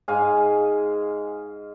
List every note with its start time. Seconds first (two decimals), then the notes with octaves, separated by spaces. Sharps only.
0.08 G#2 F5 G#5